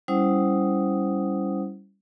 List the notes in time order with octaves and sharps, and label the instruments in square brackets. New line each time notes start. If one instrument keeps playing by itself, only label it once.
[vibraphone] G3 C#4 E4 C5 F#5 D#6